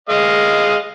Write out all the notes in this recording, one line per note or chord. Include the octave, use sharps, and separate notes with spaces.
G#3 D#5 F5